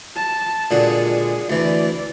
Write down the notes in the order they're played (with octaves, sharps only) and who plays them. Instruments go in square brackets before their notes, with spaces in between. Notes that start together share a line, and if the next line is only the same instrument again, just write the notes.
[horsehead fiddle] A5
[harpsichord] A#2 D3 F#4 [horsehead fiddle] G#3 G#4
[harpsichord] D2 E3 [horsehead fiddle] E4 D5